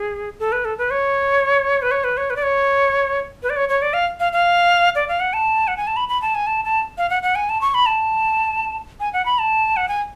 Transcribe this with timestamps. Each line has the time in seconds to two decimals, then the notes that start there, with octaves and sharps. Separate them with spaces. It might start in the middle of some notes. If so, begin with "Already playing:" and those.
Already playing: G#4
0.39 A4
0.52 B4
0.65 A4
0.78 B4
0.91 C#5
1.82 B4
1.91 C#5
2.04 B4
2.17 C#5
2.30 B4
2.36 D5
2.43 C#5
3.43 B4
3.50 D5
3.56 C#5
3.69 C#5
3.82 D5
3.94 F5
4.20 F5
4.33 F5
4.95 D5
5.08 F5
5.20 F#5
5.33 A5
5.68 F#5
5.77 G#5
5.87 A5
5.97 B5
6.09 B5
6.22 A5
6.35 G#5
6.47 A5
6.65 A5
6.98 F5
7.10 F#5
7.23 F#5
7.35 G#5
7.49 A5
7.61 C#6
7.74 B5
7.86 A5
9.00 G#5
9.13 F#5
9.26 B5
9.39 A5
9.77 F#5
9.88 G#5